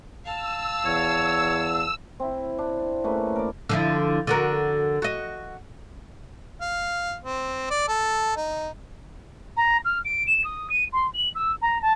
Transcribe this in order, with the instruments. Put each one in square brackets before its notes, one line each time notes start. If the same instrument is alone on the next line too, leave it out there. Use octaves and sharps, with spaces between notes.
[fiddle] F5 A5 [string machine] E6
[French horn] E2 [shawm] C#5
[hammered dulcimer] C4 E4
D4
C#3 A3 A#3 B4
A#4 D5
[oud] D3 F3 E4
D3 F#4 A#4
F#4 D#5
[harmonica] F5
C4
D5
A4
D#4
[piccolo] A#5
F6
D7
E7
D#6
D#7
C6
F#7
E6
A#5
A5